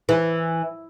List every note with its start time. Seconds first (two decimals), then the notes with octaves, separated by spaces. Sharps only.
0.09 E3